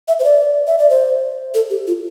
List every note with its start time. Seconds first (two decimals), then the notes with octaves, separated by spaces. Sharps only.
0.08 E5
0.19 C5
0.24 D5
0.67 E5
0.79 D5
0.90 C5
1.54 A4
1.70 G4
1.87 F4